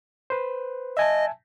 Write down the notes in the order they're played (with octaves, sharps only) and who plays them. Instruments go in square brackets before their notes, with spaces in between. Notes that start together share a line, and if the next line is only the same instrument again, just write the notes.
[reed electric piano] B4 C5
[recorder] D#5 [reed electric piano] E5 G#5 A5